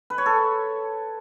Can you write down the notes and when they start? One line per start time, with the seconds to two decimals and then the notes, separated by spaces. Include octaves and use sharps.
0.10 B4
0.18 C#5
0.26 A4